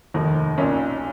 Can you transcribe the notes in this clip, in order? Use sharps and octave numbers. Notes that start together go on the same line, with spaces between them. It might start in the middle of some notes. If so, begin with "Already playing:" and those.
F1 D#2 D#3 D#4
B1 A#2 C#4